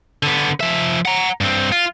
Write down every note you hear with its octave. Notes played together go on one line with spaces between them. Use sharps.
D3 B3
F3 E5
F#5 A#5
G2 C4
F4